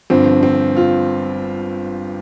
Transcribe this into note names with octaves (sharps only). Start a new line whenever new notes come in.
G1 G2 D3 F3 C4
C4
F4